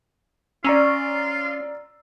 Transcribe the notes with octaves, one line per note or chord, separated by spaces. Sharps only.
C#4 F4 D5 A#5 E6